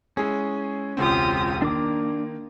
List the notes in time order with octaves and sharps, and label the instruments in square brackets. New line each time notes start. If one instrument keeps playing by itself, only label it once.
[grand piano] G#3 E4 G#4 [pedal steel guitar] C#4
[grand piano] E1 C#2 C4 [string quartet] F4 G4 D#6
[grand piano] D#3 [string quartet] A#3 [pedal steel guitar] D4 D6